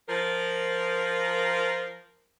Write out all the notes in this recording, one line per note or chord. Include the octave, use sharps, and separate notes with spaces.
F3 A#4